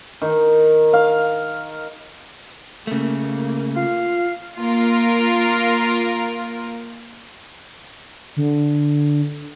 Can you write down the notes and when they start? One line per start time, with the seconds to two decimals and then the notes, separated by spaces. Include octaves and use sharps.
0.22 D#3
0.93 F5
2.87 C#3 A3 A#3
3.76 F4 F5
4.57 A#3 F4 A#4
8.37 D3